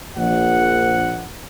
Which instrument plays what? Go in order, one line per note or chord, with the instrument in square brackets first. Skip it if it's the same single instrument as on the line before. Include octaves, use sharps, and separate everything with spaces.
[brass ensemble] A#1 F#5